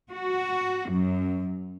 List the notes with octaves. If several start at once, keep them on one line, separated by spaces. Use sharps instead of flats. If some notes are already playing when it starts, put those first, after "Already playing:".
F#4
F#2